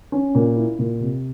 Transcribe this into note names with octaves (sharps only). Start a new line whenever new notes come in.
C#4
A#2
E4
A#2
C3